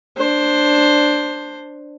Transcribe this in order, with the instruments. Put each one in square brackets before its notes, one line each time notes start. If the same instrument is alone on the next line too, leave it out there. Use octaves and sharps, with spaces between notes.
[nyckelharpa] D4 C5